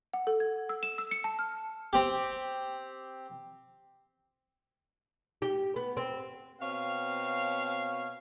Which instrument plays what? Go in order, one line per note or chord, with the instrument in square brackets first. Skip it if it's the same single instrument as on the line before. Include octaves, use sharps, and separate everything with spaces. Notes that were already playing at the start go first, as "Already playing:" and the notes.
[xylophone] F#5
A4
G#6
E6
E7
E6
C#7
A5
F6
[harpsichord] C4 G4
[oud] G4
B3
C4
[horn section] B2 C4 C#5 F5